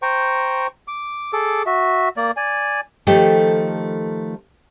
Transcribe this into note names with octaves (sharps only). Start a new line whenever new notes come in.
C5 G5 A#5 C#6
D6
G#4 A4 D6
F#4 E5
A#3 D5
D5 G#5
D#3 F3 A3 G4 A4 G5